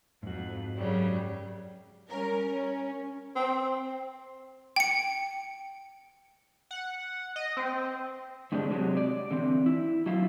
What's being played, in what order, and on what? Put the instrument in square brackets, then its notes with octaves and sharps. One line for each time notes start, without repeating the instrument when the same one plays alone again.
[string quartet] F2 [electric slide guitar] G#2 F#4
[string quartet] F#2 C#3 G3
[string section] G3 C#4 A#4
C#4
[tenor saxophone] C4
[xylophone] G5 C#7
[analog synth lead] F#5
D#5
C4
[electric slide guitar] G2 D3 G3 G#3 C4 D4
C3 E3 F#3 G#3
D5
D3 E3 C4
E4
F#3 E4 F4